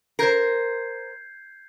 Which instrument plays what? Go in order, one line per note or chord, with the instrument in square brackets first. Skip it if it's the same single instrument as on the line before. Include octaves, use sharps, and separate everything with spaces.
[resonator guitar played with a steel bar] A#4 C5 [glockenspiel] G6 G#6 C7